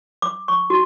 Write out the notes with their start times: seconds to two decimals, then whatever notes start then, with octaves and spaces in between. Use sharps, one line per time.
0.22 D6
0.48 C#6
0.70 F#4